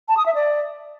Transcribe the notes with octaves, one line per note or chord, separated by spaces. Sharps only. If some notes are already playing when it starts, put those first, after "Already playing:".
A5
D#6
E5
D5